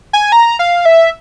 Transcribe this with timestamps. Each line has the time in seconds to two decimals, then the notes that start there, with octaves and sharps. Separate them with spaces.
0.13 G#5
0.32 A#5
0.59 F5
0.85 E5